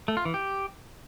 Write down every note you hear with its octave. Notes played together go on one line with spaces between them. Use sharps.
A3
F4
E3
G4